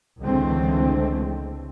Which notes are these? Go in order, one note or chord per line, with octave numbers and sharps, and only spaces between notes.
C#2 D3 E3 G#3 A3 C4